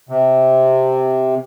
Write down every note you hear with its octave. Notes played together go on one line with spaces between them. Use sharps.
C3